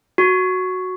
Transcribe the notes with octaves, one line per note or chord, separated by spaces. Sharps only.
F#4